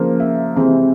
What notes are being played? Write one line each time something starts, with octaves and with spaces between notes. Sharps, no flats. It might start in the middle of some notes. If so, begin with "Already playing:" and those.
Already playing: C#3 F3 A#3
E5
C3 E3 G#3 C4